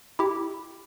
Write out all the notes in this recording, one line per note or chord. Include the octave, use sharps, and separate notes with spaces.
E4 G4